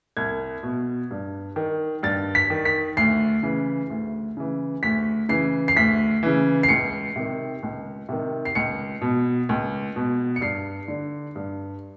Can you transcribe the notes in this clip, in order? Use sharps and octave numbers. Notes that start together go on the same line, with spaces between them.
C2 G#6
B2
G2
D#3
G2 A6
B6
D#3
B6
D2 C7
C#3 E3
D2
C#3 E3
D2 B6
C#3 E3 C7
C7
D2 B6
C#3 E3
C7
C#2 C#7
C3 D#3
C#2
C3 D#3
C7
C#2 C#7
B2
C#2
B2
C#7
G2 C7
D3
G2